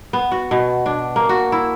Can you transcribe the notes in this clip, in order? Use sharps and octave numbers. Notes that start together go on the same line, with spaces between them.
B3
F#4
B2
D4
A#3
F#4
E4